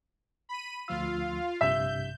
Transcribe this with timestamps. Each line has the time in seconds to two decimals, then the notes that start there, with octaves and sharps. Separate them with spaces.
0.49 B5 D#7
0.88 D2 F3 F4 F5 E6
1.61 A#1 G2 C3 E5 G6